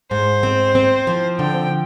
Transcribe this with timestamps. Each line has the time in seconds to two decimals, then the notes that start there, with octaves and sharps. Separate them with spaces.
0.11 G#2 C5
0.43 C4
0.75 C4
1.07 F3
1.39 D3 G5